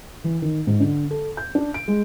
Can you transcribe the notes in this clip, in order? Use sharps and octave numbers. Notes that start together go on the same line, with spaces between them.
E3
D#3
G#2
D3
A4
G6
D4
D7
G#3